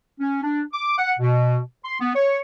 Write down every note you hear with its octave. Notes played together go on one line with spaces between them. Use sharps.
C#4
D4
D6
F#5
B2
C6
B3
C#5